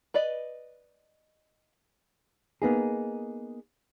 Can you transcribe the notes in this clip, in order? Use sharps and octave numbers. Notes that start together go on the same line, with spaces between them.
B4 D5 D#5
A#3 B3 D#4 G#4